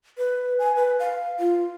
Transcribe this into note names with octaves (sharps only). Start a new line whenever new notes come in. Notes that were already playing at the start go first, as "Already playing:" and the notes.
B4
G#5
B4
F5
F4